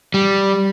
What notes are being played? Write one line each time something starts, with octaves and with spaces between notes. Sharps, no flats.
G3